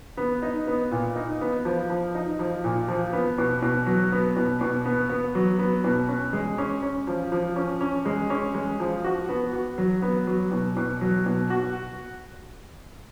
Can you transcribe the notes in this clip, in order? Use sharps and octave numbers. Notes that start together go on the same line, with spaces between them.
B3
D#4
B3
A#2
D#4
B3
F3
F3
D#4
F3
A#2
F3
B3
B2
B2
F#3
B3
B2
B2
B3
B3
F#3
B3
B2
C#4
G#3
C#4
C#4
F3
F3
C#4
C#4
G#3
C#4
G#3
F3
F#4
B3
F#4
F#3
B3
F#3
B2
B2
F#3
B2
F#4